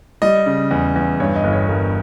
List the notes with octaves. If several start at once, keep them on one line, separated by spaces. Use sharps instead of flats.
G3 D#5
C#3
E2
E2
G2 C#5
D#5
G1
C#5
G2 A#4